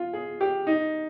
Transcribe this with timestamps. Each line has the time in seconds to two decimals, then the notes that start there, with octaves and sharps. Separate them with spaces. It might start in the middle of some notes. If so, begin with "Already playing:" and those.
Already playing: F4
0.13 G#4
0.41 G4
0.67 D#4